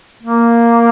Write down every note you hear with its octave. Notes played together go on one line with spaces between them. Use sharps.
A#3